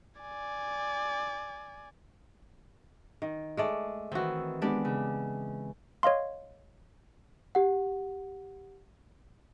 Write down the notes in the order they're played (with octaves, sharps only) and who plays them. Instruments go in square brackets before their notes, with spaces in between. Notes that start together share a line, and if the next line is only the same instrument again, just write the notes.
[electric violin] D5 G#5
[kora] D#3
G#3 A3 D5
[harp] D#3 E3 [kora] C4 F#4
[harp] G#3 B3 [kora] D4 G4 D5
[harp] C#3
[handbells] C#5 D#5 F5 C6
[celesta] G4 F#5